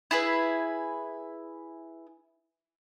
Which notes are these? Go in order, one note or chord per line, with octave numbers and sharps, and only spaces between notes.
E4 G#4 B4